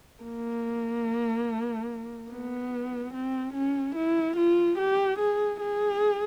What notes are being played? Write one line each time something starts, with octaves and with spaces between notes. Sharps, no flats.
A#3
B3
C4
C#4
E4
F4
G4
G#4
G#4